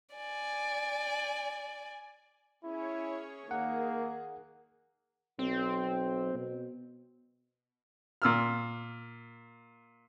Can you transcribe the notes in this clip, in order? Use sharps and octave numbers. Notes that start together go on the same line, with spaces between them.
D5 G#5
C#4 E4 G#4 C#5
D#3 A#3 G#4 F#5
B1 C4
B2
A#2 E6 F6